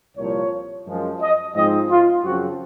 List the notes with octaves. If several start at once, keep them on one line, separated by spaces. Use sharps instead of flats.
C2 A#2 F3 C#5
F#2 F3 G#3
D#5
G#2 F3 G#3 C4 D#4 D#5
F4
F#2 C#3 F3 C4 F#4